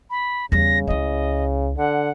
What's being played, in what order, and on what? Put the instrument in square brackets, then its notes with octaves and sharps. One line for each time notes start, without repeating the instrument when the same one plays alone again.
[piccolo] B5
[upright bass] E2 G3 [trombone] C#3 [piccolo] A#6
[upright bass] C#2 E4 [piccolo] D#5
[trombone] D3 [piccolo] F#5